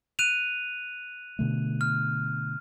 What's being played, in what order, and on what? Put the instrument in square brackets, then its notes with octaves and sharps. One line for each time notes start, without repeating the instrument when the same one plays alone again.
[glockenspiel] F#6 D#7 F7
[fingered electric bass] B2 D3 A3
[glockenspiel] F6